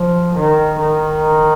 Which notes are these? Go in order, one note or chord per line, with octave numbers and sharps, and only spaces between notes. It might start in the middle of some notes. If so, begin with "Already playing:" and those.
Already playing: F3
D#3
D#3